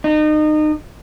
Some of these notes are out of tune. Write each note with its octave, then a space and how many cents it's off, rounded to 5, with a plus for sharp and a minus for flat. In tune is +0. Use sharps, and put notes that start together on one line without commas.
D#4 -30